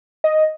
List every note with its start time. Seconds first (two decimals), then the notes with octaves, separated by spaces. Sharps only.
0.24 D#5